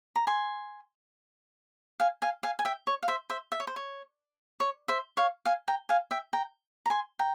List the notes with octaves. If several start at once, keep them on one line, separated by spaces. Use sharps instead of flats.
A#5
G#5 C6
F5 G#5
F5 G#5
F5 G#5
G#5
E5 G5
C#5
F5
C5 E5
C5 E5
E5
C#5
C5
C#5
C#5
C5 E5
C#5 F5
F5 G#5
G5 A#5
F5 G#5
E5 G5
G5 A#5
A#5
G#5 C6
G5 A#5